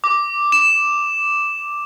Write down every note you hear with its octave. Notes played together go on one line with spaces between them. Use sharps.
D6
E7